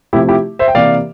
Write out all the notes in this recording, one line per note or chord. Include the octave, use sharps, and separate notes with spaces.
C3 F3 A3 E4 G4
E4 G4
C5 E5
G5
C3 E3 A#3 D5 F5